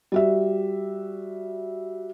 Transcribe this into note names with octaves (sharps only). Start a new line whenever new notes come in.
G3 F#4 E5